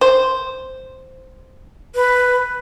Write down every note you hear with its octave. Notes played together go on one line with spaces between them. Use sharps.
C5
B4